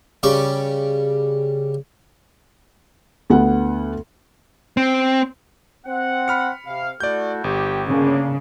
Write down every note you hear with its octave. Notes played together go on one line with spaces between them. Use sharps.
C#3 G3 D5 C#6
D2 B3 F#5
C4
C4 F#5
B5 F6 C#7
C3 F5
A3 E4 F#4 D5 G6
G1 G4
C#3 A#3 D4